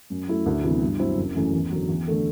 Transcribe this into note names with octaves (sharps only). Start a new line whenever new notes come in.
F#2
F#3 A3 E4
D2
C3 E3 B3 E4
G2
F#3 C4 E4
F#1
F#2 E3 A3
E2
D3 F#3
E2
D3 A3